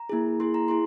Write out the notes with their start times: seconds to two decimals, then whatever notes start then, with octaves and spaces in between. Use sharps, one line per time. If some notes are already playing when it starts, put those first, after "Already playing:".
Already playing: A#5
0.09 A#3 E4 G#4
0.40 A#3 E4 G#4 C6
0.54 A#5
0.68 E4 G#4 C6